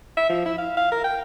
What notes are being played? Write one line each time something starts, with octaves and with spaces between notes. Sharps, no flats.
E5
F3
E4
F5
F5
A#4
G5